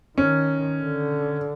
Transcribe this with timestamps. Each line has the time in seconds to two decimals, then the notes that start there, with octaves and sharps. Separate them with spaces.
0.18 D#3 C#4
0.83 D3